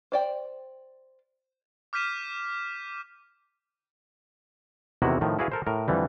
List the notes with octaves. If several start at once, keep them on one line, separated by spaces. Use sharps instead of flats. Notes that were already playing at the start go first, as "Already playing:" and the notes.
C5 D5 G5
D6 F6 G6 B6 D#7 E7
E2 C3 D#3 E4 F#4 F#5
A2 D#3 F3
E4 F#4 G#4 B4 D5 F5
A4 A#4 C5
A2 A#4
F2 D3 E3 G3